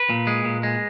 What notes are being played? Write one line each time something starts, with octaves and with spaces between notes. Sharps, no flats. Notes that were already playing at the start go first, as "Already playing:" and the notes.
Already playing: B4
A#2
G#3
A#2
G#3